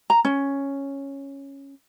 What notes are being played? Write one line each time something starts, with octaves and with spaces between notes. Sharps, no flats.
A#5
C#4